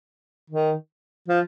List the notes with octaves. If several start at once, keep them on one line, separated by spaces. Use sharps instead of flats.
D#3
F3